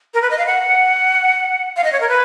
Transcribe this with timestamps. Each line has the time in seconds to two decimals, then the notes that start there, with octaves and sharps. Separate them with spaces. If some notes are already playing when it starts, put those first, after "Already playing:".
0.14 A#4
0.22 B4
0.31 D#5
0.38 F5
0.46 F#5
1.76 F5
1.84 D#5
1.92 C#5
2.01 A#4
2.09 B4